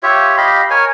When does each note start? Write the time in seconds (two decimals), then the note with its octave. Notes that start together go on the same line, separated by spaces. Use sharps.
0.03 F4 G4 C#5 E5
0.37 G4 D#5 F5 B5
0.70 A#4 C#5 G#5